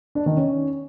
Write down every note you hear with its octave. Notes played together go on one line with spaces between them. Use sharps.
D4
D#3
C#4